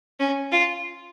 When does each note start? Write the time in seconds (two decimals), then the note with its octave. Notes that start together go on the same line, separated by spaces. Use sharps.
0.20 C#4
0.52 F4